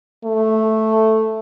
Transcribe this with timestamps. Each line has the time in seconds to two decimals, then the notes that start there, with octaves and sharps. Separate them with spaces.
0.24 A3